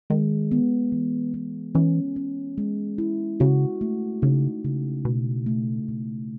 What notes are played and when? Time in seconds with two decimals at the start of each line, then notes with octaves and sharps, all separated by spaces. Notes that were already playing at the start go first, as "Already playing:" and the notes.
0.10 D#3 G#3
0.51 B3
0.92 E3
1.34 B3
1.75 E3 C#4
2.16 C#4
2.58 G#3
2.98 E4
3.40 C#3 F#4
3.81 A3
4.22 C#3 D#4
4.64 C#3
5.05 B2 A3
5.46 A3
5.88 B2